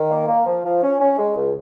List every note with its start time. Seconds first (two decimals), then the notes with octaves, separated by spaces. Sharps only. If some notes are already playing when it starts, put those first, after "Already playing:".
Already playing: D#3
0.10 A#3
0.28 A#3
0.46 F3
0.64 F3
0.83 C#4
1.00 C#4
1.18 G#3
1.36 C#2